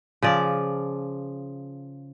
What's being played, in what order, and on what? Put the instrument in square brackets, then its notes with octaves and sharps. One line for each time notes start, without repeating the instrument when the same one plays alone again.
[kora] C#3 F3 D5